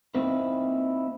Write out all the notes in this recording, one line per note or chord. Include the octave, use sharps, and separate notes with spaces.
A#3 C4 D#4 E4 B4